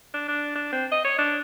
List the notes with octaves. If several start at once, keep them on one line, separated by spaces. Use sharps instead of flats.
D4
D4
D4
C4
D#5
C#5
D4